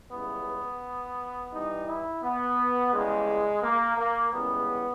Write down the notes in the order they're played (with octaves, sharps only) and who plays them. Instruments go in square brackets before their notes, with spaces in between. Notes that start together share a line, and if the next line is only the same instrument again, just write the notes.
[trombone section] C#2 C#3 E3 G3 B3
G2 E3 G3 D#4
E4
B3
E2 C#3 G3 G#3
A#3
A#3
C#2 C#3 E3 G3 B3